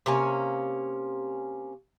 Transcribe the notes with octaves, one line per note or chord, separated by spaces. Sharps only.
C3 A#3 C#4